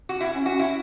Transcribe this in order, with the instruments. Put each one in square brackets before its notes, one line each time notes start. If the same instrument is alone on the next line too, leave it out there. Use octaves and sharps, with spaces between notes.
[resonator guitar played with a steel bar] F#4
E4
[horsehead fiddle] C#4
[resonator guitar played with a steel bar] F#4
E4